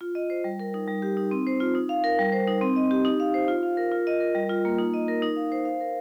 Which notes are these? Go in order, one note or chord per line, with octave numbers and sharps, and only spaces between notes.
F4
D#5
C5
G3
A#4
D#4
G3
G4
D#4
C4
C5
F4
D#4
F5
A#4
G3
C5
D#4
C4
D#5
G4
D#4
F5
C5
F4
F5
A#4
F4
D#5
A#4
G3
F4
A#3
D#4
D#5
A#4
D#4
F5
C5
F5
A#4